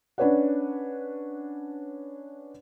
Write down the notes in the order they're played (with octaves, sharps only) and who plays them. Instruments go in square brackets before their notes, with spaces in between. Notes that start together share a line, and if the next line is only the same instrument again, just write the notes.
[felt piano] C#4 D4 B4 C#5 D5 F#5